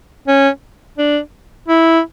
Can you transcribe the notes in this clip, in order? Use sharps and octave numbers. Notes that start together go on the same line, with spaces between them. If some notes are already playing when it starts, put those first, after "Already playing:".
C#4
D4
E4